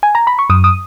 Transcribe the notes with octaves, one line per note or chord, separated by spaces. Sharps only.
G#5
A#5
B5
C#6
F#2 D#6
D#6